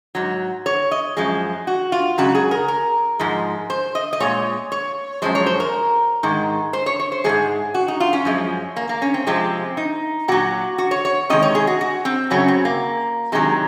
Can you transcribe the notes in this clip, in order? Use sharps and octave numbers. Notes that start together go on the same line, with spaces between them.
G#2 F#3
C#5
D#5
F#2 F3 G#3
F#4
F4
F#2 C#3 G#3 F#4
G#4
A#4
A#4
G#2 F3 G#3
C5
D#5
D#5
A#2 G#3 C#5
C#5
F#2 F3 G#3 C5
C#5
C5
A#4
G#2 D#3 G#3
C5
C#5
C#5
C5
G#2 F3 G#3 G#4
F#4
D#4
F4
C#4
F#2 F3 G#3
A#3
A#3
C#4
C4
C3 F3 G#3 C4
D#4
A#2 F#3 F#4
F#4
C#5
C#5
C3 D#3 G#3 D#5
C#5
G#4
F#4
F#4
C4
F#2 C#3 F#3 C#4
C4
A#3
C3 D#3 F#3 G#3